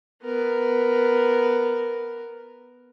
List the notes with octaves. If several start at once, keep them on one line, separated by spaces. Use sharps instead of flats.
B3 A#4